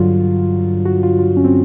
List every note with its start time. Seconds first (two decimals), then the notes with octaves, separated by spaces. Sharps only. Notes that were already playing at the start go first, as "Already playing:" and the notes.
Already playing: G2 D3 F#3 F4
0.85 F#4
1.03 F4
1.19 F4
1.37 C#4
1.44 C4